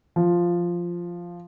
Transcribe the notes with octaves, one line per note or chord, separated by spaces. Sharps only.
F3